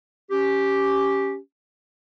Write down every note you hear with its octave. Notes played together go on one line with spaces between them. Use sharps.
C#4 G4